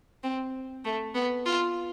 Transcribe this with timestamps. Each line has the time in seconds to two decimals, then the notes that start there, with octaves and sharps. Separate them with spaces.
0.23 C4
0.85 A3
1.15 B3
1.46 F4